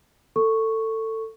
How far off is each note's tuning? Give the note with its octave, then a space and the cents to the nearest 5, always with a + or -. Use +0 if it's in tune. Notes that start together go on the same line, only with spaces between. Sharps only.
A4 +20 C#6 +0